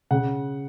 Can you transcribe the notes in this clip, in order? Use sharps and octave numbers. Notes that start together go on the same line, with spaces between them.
C#3 F#5